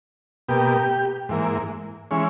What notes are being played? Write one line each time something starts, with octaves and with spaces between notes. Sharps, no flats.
B2 A#3 G4
G#2 E3 A#3
E3 G#3 C#4